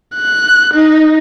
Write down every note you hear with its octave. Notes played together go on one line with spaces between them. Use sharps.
F#6
D#4